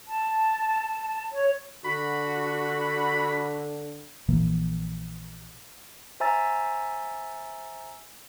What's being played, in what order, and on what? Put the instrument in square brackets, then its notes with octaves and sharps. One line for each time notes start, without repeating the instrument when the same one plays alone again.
[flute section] A5
C#5
[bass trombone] D3 [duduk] F#4 [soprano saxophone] B5
[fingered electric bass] A#1 A#2 E3 A#3
[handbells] C5 E5 G#5 A#5 E6 A6